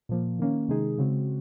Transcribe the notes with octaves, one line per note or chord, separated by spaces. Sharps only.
A#2 F3 A#3
D#3 A#3 C#4
C3 D#3 G#3 D#4 G#4
C#3 G#3 C4 F#4